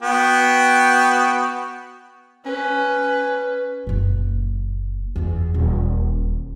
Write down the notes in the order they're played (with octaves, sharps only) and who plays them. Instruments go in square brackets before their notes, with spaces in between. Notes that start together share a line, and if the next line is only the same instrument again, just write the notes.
[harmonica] B3 F#4 G5
[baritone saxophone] C#4 [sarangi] B4
[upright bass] F#1 A#2
F#1 E2
D#1